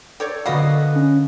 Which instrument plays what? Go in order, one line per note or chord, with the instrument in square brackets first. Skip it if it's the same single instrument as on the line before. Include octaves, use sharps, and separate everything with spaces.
[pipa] G4 C#5 D5 [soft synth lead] A4
[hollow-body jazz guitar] D3 F#4 F5 [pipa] A#3 B3 D#5
[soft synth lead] C#4